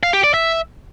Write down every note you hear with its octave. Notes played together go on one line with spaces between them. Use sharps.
F5
G4
D5
E5